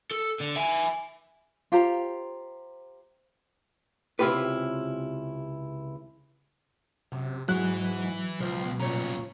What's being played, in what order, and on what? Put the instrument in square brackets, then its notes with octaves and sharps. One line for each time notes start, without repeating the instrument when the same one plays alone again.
[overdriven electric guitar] A4
D3
E5 G#5
[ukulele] F4 G4 C5 A#5
[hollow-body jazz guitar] C#2 C3 E4 F4 G4 B4
[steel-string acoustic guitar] F#2 [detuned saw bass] C3
[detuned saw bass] G#2 [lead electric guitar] E3 E4 [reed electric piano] F#3 F#6 [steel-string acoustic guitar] G#3 F#4
[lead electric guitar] C#2 [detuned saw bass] B2 [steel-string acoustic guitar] F3
[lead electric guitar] G2 C#3 [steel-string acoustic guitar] A#2 C#5 A#5